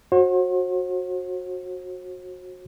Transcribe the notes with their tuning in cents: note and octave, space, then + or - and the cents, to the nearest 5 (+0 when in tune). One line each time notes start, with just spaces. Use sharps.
F#4 -15 C5 +45